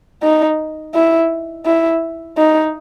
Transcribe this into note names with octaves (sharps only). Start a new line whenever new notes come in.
D#4
E4
E4
D#4